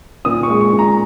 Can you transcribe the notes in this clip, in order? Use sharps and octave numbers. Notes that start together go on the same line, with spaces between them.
A#2 D#6
C#6
G#3
C#6
A#2
A#5